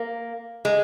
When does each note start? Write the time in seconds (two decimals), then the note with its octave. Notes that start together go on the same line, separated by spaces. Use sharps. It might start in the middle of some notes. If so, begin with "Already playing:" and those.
Already playing: A#3
0.65 G#3